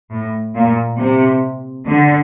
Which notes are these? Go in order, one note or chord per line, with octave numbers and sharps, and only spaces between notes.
A2
A#2
C3
D3